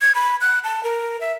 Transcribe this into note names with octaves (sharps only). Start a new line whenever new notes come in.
G#6
B5
F#6
A5
A#4
E5